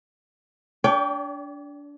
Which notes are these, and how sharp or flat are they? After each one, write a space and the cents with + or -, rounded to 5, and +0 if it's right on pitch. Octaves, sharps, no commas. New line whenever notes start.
D4 -25 C#5 +45 G5 +5